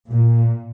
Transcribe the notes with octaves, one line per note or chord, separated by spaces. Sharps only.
A#2